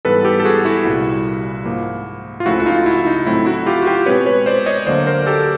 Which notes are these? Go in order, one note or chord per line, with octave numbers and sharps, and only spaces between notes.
G#2 E3 G3 B3 A4 B4
G4 A4
A4
F#4 G#4
E4 F#4
C2 A#2 G3
G#2 F3 A#3
F4
C#2 C#3 F3 A3 E4 F#4
F#4
D#4 F4
E4
D#4
A2 F#3 A3 C4 E4
E4 F#4
F4 G4
F#4
F4 G4
B2 G#3 C4 B4 C#5
B4 C#5
C5 D5
C#5 D#5
D2 D3 F#3 A#3 C5 D5
A#4 C5
G4 A4